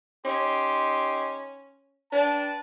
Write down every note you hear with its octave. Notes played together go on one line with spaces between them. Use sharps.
C#4 D#4 G4 C6
D4 B4 G5 A5